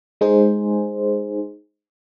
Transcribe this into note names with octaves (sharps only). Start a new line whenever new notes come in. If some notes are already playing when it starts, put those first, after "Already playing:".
G#3 D#4 G#4 C5